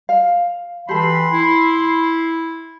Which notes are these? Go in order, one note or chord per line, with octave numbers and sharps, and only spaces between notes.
F5
E3 G4 A4 B5 C6
E4